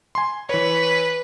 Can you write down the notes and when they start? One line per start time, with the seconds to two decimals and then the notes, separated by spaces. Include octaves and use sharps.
0.15 G#5 C6
0.49 E3 B4 C#5